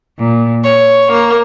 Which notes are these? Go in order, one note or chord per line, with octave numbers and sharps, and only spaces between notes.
A#2
C#5
A#3